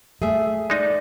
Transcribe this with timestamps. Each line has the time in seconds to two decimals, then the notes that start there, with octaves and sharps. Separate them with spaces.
0.22 A3 G#4 E5
0.70 G#3 D#4 D5